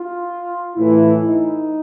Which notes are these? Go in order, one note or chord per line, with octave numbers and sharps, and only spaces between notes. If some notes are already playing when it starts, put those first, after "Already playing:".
Already playing: F4
A2 E3 A3 E4
D#4